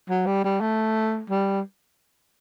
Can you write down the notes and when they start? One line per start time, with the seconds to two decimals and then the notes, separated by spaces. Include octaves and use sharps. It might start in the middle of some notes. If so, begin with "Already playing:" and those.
0.10 F#3
0.26 G3
0.45 G3
0.61 A3
1.30 G3